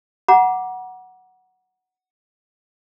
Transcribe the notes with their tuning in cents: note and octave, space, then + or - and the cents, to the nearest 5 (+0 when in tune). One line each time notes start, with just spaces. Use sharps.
F#5 +0 A#5 +35 D6 +0